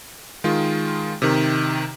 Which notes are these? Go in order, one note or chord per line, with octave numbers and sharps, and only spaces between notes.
D#3 G#3 F4
C3 D#3